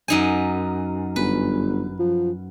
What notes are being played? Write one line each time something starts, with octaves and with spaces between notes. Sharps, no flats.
F#2 D#4 G#5
G1 B4
F3